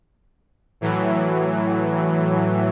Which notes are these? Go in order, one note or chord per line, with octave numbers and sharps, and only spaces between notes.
A2 E3 F#3